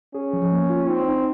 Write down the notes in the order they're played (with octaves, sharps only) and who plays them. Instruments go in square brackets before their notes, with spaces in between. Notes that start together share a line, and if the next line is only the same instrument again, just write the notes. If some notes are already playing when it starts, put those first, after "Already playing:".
[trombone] C#4 [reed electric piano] G#4
[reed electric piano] F3
A#3
F4
[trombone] C4 [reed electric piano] D#4
[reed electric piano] D#4